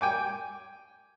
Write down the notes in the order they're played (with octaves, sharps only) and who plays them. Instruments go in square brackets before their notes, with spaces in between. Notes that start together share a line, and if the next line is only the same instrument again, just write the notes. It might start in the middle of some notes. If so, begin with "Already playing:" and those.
[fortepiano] G5 G#5 D6